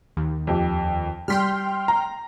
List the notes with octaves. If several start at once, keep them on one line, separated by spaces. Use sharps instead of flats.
D#2
F2 G4
G3 G5 C6 F6 B6
A#5